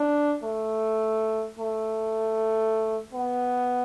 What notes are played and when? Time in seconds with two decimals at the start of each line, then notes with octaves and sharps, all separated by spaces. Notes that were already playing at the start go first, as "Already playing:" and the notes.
Already playing: D4
0.43 A3
1.59 A3
3.13 B3